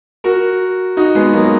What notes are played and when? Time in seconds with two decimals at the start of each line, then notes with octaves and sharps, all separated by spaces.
0.24 F#4 A#4
0.97 D#4 F#4
1.15 G#3 B3
1.33 F#3 A#3